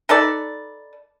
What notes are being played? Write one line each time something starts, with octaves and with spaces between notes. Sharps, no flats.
D#4 A4 B4 D5